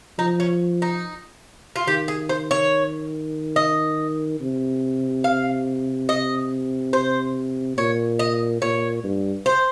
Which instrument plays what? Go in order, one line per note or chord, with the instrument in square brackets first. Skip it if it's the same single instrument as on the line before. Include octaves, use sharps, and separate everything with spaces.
[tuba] F3 [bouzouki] D#4
[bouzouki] C#4
D#4
F4
[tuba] D#3 [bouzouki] G4
[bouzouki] G#4
C5
C#5
D#5
[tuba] C3
[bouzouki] F5
D#5
C5
[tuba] A#2 [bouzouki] C#5
[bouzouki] D#5
[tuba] A#2 [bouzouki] C#5
[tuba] G2
[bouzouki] C5